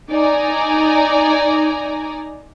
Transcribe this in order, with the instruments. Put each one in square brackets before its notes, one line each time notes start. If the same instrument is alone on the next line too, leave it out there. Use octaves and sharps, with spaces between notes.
[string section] D#4 D5 G#5 A#5